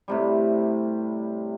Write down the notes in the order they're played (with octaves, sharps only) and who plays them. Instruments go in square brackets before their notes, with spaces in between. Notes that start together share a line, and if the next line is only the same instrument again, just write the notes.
[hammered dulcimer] A2 C3 G3